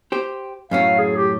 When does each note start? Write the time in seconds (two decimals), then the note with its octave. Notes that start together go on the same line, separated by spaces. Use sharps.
0.12 G4 C5
0.71 F#2 A2 C#4 F5
0.98 G#4
1.16 G4